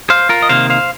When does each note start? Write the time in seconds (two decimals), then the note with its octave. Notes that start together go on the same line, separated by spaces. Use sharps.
0.10 C5 F5
0.29 F4 A#4
0.42 D#5
0.49 C3 D#3 A#3 C5 F5
0.70 C5 F5